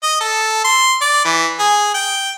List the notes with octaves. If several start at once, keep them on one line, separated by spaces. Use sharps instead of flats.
D#5
A4
C6
D5
E3
G#4
G5